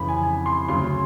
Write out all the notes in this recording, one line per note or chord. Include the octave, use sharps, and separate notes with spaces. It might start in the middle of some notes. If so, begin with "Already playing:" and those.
Already playing: F2 C#3 E3 B5
G#5
G#5
C6
D2 C#3 F#3 C6